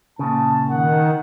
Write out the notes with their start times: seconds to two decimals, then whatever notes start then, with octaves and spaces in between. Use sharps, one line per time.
0.19 A#2 C#3 A5
0.69 D#3 F#5